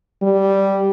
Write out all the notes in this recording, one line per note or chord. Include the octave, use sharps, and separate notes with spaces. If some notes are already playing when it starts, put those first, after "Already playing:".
G3